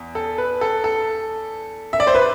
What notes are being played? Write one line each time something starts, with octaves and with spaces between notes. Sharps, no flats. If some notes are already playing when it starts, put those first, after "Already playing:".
Already playing: E2
A4
B4
A4
A4
E5
D5
C5
B4